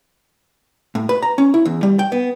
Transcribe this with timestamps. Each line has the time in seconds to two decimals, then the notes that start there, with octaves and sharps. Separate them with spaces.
0.95 A2
1.09 B4
1.22 A#5
1.38 C#4
1.54 E4
1.65 E2
1.83 G3
1.99 G5
2.12 B3